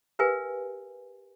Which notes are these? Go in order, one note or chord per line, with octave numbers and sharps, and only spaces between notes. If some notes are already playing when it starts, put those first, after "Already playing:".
G4 A#4 B4 F5 G#5